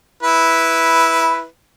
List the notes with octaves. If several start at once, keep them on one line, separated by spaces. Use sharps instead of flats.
E4 B4